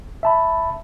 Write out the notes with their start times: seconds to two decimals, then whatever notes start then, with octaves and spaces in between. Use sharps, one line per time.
0.23 E5 A5 B5